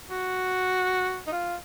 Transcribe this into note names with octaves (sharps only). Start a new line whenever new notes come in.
F#4
D#4
F4